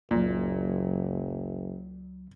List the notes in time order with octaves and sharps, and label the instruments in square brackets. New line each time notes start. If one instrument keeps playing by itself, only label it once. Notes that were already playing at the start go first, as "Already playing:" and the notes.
[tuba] F#1 [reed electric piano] C#2 F#3 [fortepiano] A#2